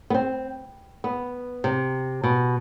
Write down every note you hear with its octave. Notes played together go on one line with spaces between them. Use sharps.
B3
C4
B3
C3
B2